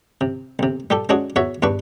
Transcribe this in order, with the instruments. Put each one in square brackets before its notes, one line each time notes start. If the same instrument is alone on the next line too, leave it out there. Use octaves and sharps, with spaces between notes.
[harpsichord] C3
B1 C3
G3 G4 A4
G#3 C#4 D4 F#4 G#4
E2 F#4 C#5 E5
E2 G2 D4 B4 C#6